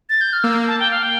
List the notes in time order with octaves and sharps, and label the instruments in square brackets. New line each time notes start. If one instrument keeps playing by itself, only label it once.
[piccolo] A6
G6
F6
[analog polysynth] A#3 [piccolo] E6
[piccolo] A5
G5
F5
G5